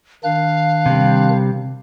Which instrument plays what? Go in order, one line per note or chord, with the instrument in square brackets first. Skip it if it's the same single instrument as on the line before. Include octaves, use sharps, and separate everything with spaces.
[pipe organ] D#3 D4 F#6 [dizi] F5
[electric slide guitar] C3 G3